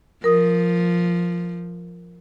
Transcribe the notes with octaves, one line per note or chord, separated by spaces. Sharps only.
F3 A#4 D#6